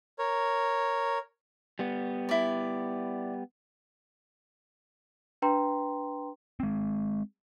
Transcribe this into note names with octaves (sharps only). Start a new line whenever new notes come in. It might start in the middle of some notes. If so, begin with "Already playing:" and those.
A#4 C#5
G3 B3
E4 D5
D4 B4 G5 A#5 C6
G#3 C4